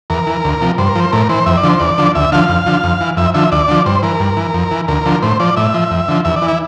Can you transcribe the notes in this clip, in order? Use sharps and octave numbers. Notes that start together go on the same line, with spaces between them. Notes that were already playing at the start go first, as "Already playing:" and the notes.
E2 A#4
E3
D2
C3 F3
G2 C5
A#4
F3 C5
A2 A#4
E3 C5
F2 E5
D5
D3 F3 C5
E2 D5
D3 F3
D2 E5
D3 F3 F5
F2
D3 F3
F2
E3
F2 E5
D3 F3 E5
D2 D5
D3 F3
G2 C5
E3 A#4
G2
E3
F2
E3
D2 A#4
D3 F3
A2 C5
F3 D5
A2 E5
F3
F2
D3 F3
E2 E5
D5
E3
E4